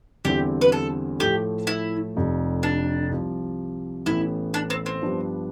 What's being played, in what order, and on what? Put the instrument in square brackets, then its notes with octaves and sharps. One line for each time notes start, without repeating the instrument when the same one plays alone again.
[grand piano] E2 D3 G3 C4 E4 [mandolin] G4
[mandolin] B4
A4
[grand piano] A2 F3 A3 [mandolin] G4
[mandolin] E4
[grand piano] F1 F2 C3
[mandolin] D4
[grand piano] C2 C3 F3
[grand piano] A1 A2 E3 B3 [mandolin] E4
[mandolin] D4
C4
C4
[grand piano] G2 F3 B3 D4 G4